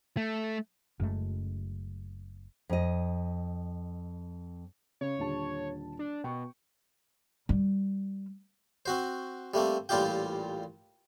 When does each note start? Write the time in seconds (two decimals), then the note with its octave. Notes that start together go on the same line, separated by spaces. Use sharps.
0.17 A3
1.00 F#1 F#2 G#3 A3
2.69 F2 D#5
5.01 C#3 C#5
5.18 D#1 D3 A5
5.99 D4
6.24 B2 G5 C#6
7.49 G3
8.86 C4 F#4 C5
9.54 G3 A3 A#3 C4
9.89 A1 A#2 G3 F4 G4 G5